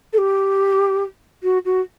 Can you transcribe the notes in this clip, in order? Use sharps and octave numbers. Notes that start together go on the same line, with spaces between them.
A4
G4
F#4
F#4